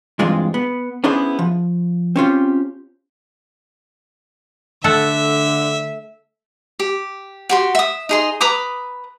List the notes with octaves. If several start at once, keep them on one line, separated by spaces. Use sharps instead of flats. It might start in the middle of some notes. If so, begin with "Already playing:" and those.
G2 E3 G#3 C4 D4 F4
B3
B3 C#4 D4 E4 G#4 C5
F3
C4 C#4 F4 G4
D3 A3 A4 E5 F#5
G4
F#4 G4 C6
E5 D#6
D#4 G#4 C6
B4 A#5 D6 D#6